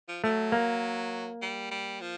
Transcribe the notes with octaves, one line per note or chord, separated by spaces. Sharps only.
F3
F3 A3
F#3
A#3
G3
G3
F3